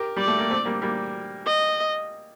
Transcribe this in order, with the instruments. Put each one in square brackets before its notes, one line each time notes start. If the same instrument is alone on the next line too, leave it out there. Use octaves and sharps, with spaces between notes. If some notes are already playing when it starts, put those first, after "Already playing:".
Already playing: [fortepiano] G4 A#4
[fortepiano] G3 [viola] D5
[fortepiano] A3
A#3
A3 C4
G3 A#3
G3 A#3
[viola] D#5